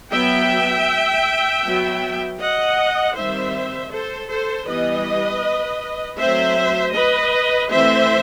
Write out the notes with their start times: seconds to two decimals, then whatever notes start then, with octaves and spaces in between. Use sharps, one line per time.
0.12 F#3 B3 E5 G5
1.64 F#3 B3
2.40 D#5 F#5
3.15 D#3 G3 C4 C5 E5
3.91 A4 C5
4.29 A4 C5
4.67 E3 G3 B3 B4 D#5
6.18 F#3 A3 C4 C5 E5
6.94 B4 D#5
7.70 E3 A3 C4 C5 E5